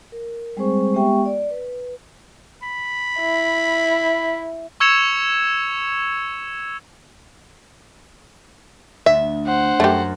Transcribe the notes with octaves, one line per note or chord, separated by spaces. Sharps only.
A#4
G3 G#3 C4 G#4 C5 C#6
G#3 B3 G4 E5 G5 C#6
D5
B4
B5
E4
C#6 E6 G#6 C#7 E7 F7
D2 E5
C5 F#5
F#2 A3 G4